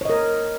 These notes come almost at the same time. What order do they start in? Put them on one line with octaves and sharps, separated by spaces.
C#5 D#5 A#4